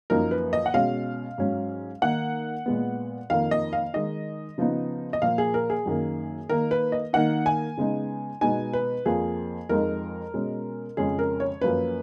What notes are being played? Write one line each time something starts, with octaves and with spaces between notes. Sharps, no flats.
F#2 F3 A#3 D#4 A#4
B4
D#5
F#5
B2 G#3 C#4 F5
G#2 F#3 C#4
D#3 A#3 D#4 F#5
A#2 G#3 B3
F2 D#3 A#3 F5
D#5
F5
D#3 G#3 D#4 D#5
C#3 F3 B3 D#4
D#5
A#2 F3 A#3 F5
G#4
A#4
G#4
F#2 D#3 A#3
D#3 A#3 D#4 A#4
B4
D#5
D#3 A#3 D#4 F#5
G#5
C#3 G#3 B3 D#4
B2 G#3 B3 D#4 G#5
B4
F2 F3 A#3 G#4
F2 F3 G#3 D#4 A#4
B2 G#3 C#4
F2 C#3 G#3 C#4 G#4
A#4
C#5
F#2 F3 A#3 C#4 B4